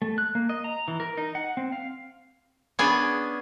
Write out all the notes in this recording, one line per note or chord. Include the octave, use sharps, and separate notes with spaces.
A3
F#6
A#3
D#5
A#5
E3
A#4
D#4
F#5
C4
F5
B3 C#4 D4 G#4